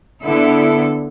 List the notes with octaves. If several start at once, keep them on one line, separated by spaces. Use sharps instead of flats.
D3 B3 E4 A4